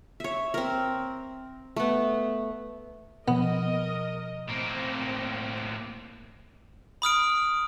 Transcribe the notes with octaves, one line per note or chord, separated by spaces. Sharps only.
C#5 E5
C4 A#4
A3 B3
B2 F3 B3 A#4 D#5
A2 A#3 C4
B5 D#6 F6 D7